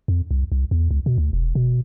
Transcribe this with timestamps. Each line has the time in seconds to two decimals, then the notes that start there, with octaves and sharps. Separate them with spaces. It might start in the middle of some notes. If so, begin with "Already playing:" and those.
0.08 F2
0.31 C2
0.52 C2
0.71 E2
0.91 C#2
1.06 B2
1.18 D2
1.33 E1
1.55 B2